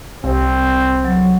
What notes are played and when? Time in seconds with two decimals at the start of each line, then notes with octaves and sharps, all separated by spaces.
0.24 C2 C4
1.04 F#3